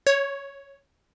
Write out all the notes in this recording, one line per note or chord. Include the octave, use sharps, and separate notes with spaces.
C#5